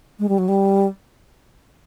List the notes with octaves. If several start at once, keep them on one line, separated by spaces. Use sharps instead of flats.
G#3
G3
F#3
G3